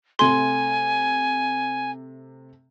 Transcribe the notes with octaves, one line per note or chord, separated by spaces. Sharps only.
C3 A3 G#5 C6